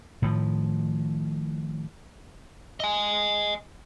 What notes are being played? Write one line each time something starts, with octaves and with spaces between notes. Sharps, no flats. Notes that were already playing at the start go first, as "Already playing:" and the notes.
A2 D#3 F3
D#5 G#5